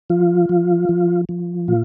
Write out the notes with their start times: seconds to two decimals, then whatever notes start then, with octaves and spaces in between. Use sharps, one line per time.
0.10 F3 F4
0.49 F3
0.89 F3
1.29 F3
1.68 A#2 F4